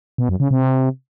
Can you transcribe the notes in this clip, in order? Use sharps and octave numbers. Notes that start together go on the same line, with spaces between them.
B2
F#2
C#3
C3